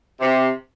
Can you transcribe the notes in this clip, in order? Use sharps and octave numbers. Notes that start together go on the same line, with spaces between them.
C3